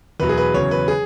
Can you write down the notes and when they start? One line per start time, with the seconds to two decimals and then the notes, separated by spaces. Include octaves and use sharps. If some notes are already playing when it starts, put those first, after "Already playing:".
0.20 E2 B2 F#3 B4
0.29 G#4
0.38 B4
0.54 E2 C#3 F#3 C#5
0.71 B4
0.88 G#4